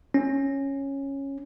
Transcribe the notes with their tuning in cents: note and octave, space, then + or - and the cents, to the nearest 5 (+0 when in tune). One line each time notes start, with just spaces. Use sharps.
C#4 -10